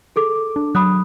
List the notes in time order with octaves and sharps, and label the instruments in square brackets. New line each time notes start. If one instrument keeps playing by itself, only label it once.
[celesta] G#4 A4 D6
[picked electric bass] D4
[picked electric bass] F#3 [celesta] B5 D#6 F#6